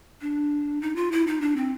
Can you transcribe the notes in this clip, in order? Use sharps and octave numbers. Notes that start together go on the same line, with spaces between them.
D4
D#4
F4
E4
D#4
D4
C4